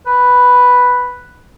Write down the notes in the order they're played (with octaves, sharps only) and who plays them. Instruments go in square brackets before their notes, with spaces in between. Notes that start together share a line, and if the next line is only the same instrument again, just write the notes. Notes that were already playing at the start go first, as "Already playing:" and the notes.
[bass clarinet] B4